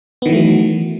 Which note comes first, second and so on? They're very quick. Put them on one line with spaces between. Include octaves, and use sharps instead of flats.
B3 D#3 E3 A3 F#3